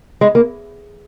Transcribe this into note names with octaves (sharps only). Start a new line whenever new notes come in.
G#3
A#3